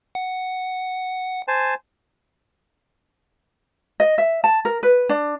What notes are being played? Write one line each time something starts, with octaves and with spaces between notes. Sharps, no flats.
F#5
C5 G#5 A5
D#5
E5
A5
A#4
B4
D4